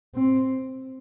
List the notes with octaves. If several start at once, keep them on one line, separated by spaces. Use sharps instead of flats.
C4